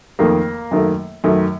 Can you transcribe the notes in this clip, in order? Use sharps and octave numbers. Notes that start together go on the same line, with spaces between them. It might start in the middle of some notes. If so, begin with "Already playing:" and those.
F2 D#3 A3 A#3
F#2 D#3 A3
F#2 D#3 A3